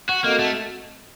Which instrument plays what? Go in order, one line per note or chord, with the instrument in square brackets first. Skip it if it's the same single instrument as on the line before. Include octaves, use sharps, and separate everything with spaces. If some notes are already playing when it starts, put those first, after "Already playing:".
[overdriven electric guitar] F#4
[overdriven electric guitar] A#3 [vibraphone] C4 F#4 A4 D#5 F#5
[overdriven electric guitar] A3